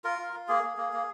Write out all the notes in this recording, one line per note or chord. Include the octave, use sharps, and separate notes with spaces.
F4 A#4
F4
F4
A#3 G#4
A#3
A#3
A#3